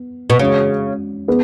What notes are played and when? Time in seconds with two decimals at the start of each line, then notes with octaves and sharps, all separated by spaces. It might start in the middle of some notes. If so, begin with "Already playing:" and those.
Already playing: B3
0.30 B2
0.39 C#3 G#3 C#4 F#4
1.28 B3 G#4